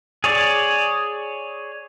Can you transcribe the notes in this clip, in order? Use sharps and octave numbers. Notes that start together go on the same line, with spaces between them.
G#4 C#5 D5